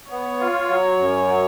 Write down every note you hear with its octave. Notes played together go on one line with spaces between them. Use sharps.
B3 C#5
F4
F#3
F#2
F#3